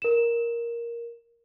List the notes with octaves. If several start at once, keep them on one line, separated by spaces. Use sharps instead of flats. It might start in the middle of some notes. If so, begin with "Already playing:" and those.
A#4 E7